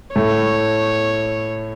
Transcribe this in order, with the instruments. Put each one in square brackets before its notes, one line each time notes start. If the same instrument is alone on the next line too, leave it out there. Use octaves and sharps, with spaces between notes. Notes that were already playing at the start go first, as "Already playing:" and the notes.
[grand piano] A2 A3 [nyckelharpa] C#5